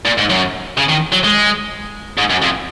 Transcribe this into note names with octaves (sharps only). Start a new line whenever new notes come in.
A#2
G#2
F#2
C#3
D#3
F#3
G#3
G#2
F#2
F2